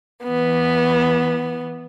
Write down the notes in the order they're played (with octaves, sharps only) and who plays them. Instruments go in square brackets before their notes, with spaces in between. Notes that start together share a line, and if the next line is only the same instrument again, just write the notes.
[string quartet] E3 B3